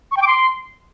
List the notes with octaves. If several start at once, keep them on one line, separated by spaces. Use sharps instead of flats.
C#6
G5
D6
C6